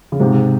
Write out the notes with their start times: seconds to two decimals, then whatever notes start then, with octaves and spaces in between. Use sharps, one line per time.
0.12 C#3
0.20 G#2 C3